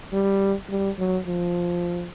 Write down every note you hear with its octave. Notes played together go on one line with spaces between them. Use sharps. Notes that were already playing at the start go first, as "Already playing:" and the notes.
G3
G3
F#3
F3